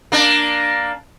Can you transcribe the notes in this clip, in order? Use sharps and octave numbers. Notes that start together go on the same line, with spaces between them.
A#3 D4